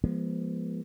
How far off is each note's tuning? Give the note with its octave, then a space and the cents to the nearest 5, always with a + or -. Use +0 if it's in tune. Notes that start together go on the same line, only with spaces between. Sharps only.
F3 -20 G#3 -10 B3 -45